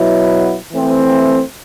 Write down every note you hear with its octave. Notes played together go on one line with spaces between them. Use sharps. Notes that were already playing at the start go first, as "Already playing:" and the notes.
Already playing: B2 F#3 B3 E4
E3 A3 C4